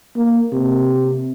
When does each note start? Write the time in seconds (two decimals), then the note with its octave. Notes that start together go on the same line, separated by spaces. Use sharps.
0.16 A#3
0.53 C3